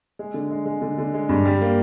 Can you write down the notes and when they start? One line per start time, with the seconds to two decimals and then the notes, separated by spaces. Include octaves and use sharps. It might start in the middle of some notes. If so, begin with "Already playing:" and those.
0.19 G#3
0.34 D3
0.51 G#3
0.66 G#3
0.82 D3
0.98 D3
1.14 G#3
1.29 G2
1.45 G3
1.62 A#3